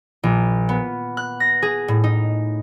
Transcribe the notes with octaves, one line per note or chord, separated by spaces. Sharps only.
A#1
B3
F#6
A#6
G#4
A2
D#4